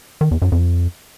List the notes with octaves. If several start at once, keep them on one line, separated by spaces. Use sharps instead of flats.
D#3
E2
F#2
F2